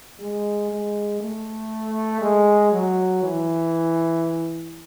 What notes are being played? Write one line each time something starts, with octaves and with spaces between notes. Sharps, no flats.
G#3
G#3
A3
G#3
F#3
E3